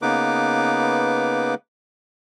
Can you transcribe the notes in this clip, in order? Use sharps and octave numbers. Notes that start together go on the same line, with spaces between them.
C#3 A#3 B3 D#4 B4 D6